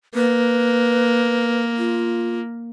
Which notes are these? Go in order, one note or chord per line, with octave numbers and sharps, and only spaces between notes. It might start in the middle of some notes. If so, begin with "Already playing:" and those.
A#3 B4
F4